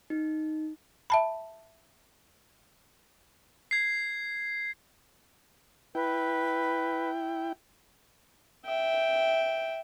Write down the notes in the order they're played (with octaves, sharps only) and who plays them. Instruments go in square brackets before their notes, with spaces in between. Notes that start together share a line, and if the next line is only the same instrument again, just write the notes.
[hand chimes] D#4
[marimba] E5 A5 B5
[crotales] G#6 C7
[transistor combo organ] E4 G5 [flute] B4
[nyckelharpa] E5 G5